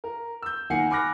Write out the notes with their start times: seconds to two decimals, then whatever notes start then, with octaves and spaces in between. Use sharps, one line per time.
0.04 A#4
0.42 E6 G6
0.70 D#3 A#3 F#5 G#5 C7 C#7
0.90 G#5 B5 D6 F6 F#6 A#6